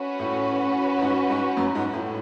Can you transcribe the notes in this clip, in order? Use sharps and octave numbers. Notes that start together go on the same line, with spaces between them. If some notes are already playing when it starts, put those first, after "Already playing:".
Already playing: C#4 F#4 B4
A2
G#2
G#2
F#2
G#2
A2